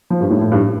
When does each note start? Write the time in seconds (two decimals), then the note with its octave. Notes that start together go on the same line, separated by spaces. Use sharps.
0.10 F3
0.21 G2
0.30 A2
0.41 A2
0.52 G2